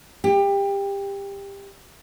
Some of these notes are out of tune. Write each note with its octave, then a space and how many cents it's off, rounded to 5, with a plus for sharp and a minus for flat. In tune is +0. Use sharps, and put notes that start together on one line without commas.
G4 +20